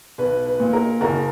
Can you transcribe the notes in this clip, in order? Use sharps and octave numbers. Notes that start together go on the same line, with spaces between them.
B1 B4
B4
A#2
A#4
F#1 A#4